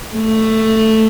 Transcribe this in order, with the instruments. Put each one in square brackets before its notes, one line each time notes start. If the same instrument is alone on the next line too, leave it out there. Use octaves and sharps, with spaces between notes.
[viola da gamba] A3